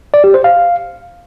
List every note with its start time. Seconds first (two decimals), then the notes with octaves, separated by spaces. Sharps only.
0.14 D5
0.24 G4
0.34 C5
0.44 F5